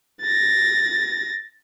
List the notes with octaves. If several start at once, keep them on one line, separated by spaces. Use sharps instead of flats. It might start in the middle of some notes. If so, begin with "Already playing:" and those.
A6 A#6